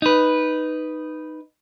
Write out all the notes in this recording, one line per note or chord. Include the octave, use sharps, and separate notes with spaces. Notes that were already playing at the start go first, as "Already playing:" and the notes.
D#4 B4